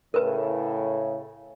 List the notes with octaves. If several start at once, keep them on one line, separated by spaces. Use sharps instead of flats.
A2 C#3 A#4 B4